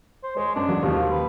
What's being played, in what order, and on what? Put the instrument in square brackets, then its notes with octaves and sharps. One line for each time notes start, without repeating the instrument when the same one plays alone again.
[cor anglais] C5
[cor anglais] G#3 [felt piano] C#5
[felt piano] F#2 [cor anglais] D4
[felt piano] F#3 G#3
[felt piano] D#2 [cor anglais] F3
[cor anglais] B4